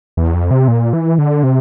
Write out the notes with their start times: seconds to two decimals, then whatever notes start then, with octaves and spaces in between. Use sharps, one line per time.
0.17 E2
0.34 F2
0.51 C3
0.68 A#2
0.93 E3
1.18 D3
1.43 C3